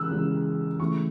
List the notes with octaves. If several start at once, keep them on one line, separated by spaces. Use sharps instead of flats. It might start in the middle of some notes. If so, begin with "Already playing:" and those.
Already playing: C#3 E3 G#3 E6 F#6
C#3 E3 G#3
C#3 E3 A3 C#6